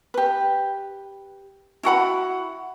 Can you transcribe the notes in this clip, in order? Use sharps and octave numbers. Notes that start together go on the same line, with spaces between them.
G4 B4
E4 F#4 F#5 B5